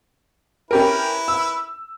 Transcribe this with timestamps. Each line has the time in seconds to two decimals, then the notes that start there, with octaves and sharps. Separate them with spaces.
0.71 C#4 E4 G4 A#4 B4
1.28 E6